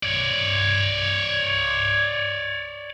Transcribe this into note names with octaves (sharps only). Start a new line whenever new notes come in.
C#5 D5